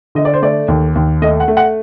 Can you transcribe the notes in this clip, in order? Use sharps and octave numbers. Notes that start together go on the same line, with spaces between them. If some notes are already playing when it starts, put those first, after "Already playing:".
D3 D#5
D5
C5
A3 D5
D#2
D#2
A3 D#5
F#5
A3
F#5